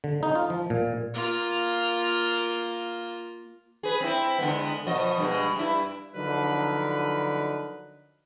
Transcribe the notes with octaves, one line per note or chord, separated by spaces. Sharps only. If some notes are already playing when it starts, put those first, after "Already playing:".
D3
D#4
F4
F3
A#2
A#3 F4
G#4 B4
C4 E4
D3 G#3 B3
B2 F3 D#5
G2 B2 G#3
G2 E4
D3 F3 F#3 D#4 A#4 B4